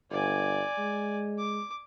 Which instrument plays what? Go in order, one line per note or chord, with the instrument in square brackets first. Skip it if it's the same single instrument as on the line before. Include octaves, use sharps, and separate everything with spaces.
[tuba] G1 [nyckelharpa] D5 G#5
[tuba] G#3
[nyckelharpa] D6